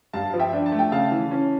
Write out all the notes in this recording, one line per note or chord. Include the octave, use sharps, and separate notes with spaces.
G2 F5 A5
F3
E5 G5
D4
A5
A3
G5
C#3 F5 A5
E3
C#4